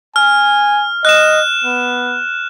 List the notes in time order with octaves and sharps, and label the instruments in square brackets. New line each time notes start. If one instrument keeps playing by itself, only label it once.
[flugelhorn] G#5 [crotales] F6
[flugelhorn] D#5 [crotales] F#6 E7
[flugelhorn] B3